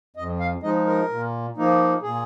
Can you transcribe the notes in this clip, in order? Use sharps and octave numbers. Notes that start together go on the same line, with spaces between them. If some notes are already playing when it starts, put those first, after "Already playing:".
F2 D#5
F5
F3 G#3 D#4 D#5
A#4
A#2
F3 A#3 D#4
A#2 G#4